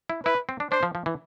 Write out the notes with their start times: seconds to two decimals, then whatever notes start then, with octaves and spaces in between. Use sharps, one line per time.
0.10 E4
0.25 E4 B4
0.49 C4
0.60 D4
0.72 D4 C5
0.83 F3
0.95 F3
1.06 E3